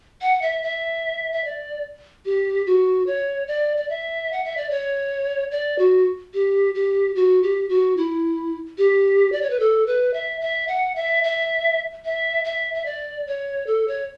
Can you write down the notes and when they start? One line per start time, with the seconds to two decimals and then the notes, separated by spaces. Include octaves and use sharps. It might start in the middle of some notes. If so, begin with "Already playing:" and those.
0.22 F#5
0.42 E5
0.63 E5
1.32 E5
1.45 D5
2.26 G4
2.66 F#4
3.07 C#5
3.48 D5
3.77 D5
3.89 E5
4.32 F#5
4.44 E5
4.57 D5
4.71 C#5
5.52 D5
5.79 F#4
6.34 G4
6.75 G4
7.15 F#4
7.43 G4
7.69 F#4
7.97 E4
8.78 G4
9.32 D5
9.42 C#5
9.50 B4
9.60 A4
9.87 B4
10.14 E5
10.41 E5
10.68 F#5
10.96 E5
11.24 E5
12.05 E5
12.45 E5
12.74 E5
12.86 D5
13.27 C#5
13.67 A4
13.88 C#5